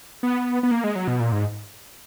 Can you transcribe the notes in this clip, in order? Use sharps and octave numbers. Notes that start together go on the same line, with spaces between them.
B3
B3
A#3
G#3
F#3
B2
A#2
G#2